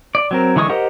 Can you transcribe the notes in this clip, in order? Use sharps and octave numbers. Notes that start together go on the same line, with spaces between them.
D5
F#3 C4 A#4
D3 E3 G#3 C#6 D#6
G4 A#4 C5 D#5 F#5